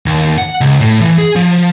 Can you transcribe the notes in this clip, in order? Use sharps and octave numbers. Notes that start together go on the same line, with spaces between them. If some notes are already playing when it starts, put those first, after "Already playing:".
D#2
F#5
C#2
A2
E3
G#4
F3